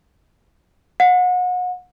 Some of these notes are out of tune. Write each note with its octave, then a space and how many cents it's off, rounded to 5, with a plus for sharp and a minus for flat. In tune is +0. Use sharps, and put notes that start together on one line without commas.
F#5 -35